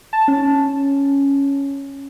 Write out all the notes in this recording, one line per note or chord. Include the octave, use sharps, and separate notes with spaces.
A5
C#4